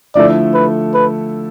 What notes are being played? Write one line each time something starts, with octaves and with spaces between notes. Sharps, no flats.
D3 F3 A3 E4 A4 D5
B4
B4